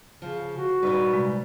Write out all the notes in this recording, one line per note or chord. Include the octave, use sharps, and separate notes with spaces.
C#3 F3
F#4
A#2 G3 D#4 B4
C3 G#3